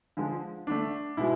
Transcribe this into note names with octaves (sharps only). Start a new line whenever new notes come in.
D3 F3 G#3
D3 A3 D4
B2 G#3 E4